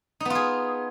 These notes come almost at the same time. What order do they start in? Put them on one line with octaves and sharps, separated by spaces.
D#4 B3 F4 G#4